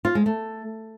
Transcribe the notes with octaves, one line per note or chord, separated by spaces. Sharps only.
F4
G#3
A3